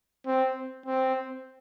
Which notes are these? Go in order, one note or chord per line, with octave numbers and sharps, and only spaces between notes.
C4
C4